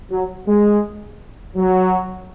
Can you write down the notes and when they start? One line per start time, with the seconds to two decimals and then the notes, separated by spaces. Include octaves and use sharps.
0.11 F#3
0.48 G#3
1.56 F#3